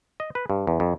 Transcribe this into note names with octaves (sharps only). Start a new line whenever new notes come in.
D#5
B4
G2
E2
F2